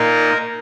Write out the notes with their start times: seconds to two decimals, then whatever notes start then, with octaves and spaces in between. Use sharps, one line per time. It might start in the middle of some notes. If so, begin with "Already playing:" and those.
Already playing: A#2 A#3 D#4 A#4